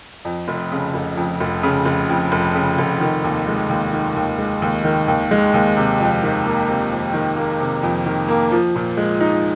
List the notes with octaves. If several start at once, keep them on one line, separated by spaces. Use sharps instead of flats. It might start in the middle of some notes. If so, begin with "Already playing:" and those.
F2
F1
C#3
F1
F2
F1
C#3
F1
F2
F1
C#3
F1
D#3
D#2
G#3
D#2
D#3
D#2
G#3
D#2
D#3
D#2
G#3
D#2
C3
F2
D#3
A#3
C3
F2
D#3
A#3
C3
F2
D#3
A#3
F3
A#2
G#3
D#4